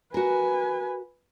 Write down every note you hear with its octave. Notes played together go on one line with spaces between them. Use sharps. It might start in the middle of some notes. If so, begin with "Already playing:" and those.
F#4 A#4 B4 G#5